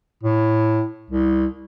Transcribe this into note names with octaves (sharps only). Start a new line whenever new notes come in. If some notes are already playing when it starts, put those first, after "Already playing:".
A2
C2